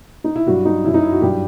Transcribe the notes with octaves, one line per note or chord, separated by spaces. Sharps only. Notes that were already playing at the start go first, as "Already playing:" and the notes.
D#4
E4
G2 F#3 F#4
D#4
F#2 F#3 E4
D#4
E4
F#4
G2 F#3 G4